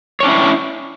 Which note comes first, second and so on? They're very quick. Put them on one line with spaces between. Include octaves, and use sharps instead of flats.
C#5 D4 C#4 E4